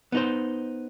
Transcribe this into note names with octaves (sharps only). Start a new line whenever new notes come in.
B3 D#4 C5